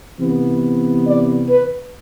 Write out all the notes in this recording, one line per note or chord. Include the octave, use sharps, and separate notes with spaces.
C3 E3 B3
D5
B4